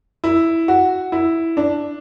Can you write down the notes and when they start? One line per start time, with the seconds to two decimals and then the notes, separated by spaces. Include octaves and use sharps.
0.24 E4
0.68 F#4
1.12 E4
1.57 D4